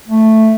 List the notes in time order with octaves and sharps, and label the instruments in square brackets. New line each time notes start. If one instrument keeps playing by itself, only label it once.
[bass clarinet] A3